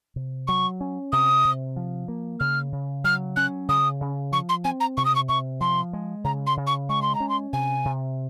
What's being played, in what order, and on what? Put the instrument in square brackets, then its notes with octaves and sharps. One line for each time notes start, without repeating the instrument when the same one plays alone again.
[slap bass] C3
[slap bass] F#3 [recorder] C#6
[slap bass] C#4
[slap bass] C3 [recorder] D#6
[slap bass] C3
F3
A#3
[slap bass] C#3 [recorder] F6
[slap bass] C#3
[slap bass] F#3 [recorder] F6
[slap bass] C#4 [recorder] F#6
[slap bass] C#3 [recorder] D#6
[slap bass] C#3
[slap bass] F3 [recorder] C#6
[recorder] C6
[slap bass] C4 [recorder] G#5
[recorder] A#5
[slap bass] C3 [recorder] C#6
[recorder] D#6
C#6
[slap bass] C3 [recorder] C#6
[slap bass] F3 [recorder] C6
[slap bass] G#3
[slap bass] C#3 [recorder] A#5
[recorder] C6
[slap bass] C#3
[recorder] C#6
[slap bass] G#3 [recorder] C#6
[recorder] C6
A#5
[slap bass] C#4
[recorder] C6
[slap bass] C3 [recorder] G#5
[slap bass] C3